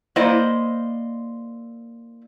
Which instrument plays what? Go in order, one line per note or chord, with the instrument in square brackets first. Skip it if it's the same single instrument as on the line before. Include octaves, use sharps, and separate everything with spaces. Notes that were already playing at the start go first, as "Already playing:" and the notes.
[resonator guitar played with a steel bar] A#3 E4 C5 D5 D#5